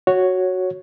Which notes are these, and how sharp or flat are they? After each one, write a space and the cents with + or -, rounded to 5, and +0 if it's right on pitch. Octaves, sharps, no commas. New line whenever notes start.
F#4 +0 C#5 +0